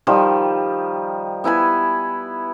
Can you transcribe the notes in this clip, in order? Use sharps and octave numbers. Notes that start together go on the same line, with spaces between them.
D#3 F3 G3
B3 E4 G#5 B5